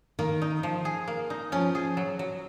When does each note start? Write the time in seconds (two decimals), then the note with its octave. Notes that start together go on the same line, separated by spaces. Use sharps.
0.19 D#3 A#3
0.42 D#4
0.63 F3
0.85 G#4
1.08 A#3
1.30 D#4
1.52 F3 C#4
1.75 G#4
1.97 F#3
2.19 F#3